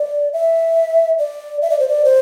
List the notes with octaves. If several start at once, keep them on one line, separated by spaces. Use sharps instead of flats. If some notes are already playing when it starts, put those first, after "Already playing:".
Already playing: D5
E5
D5
E5
D5
C5
D5
C5